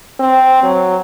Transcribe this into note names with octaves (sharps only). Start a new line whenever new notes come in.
C4
F#3